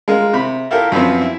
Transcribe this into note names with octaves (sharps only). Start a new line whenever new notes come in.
G#3 F4 A#4
C3 B5
E4 F4 G4 A4 A#4
F#2 F3 B3 C4
E4